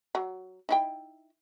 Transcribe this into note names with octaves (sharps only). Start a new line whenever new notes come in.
F#3
D#4 E4 G5